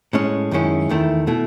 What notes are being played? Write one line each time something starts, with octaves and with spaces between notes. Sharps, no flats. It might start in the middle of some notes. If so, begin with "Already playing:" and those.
A2 G#3 C#4
F#2 D#3 G#3 C#4 E4
E2 D#3 A3 E4
B2 A3 E4